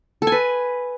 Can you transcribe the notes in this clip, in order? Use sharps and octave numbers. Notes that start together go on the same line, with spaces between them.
A4
G#5
B4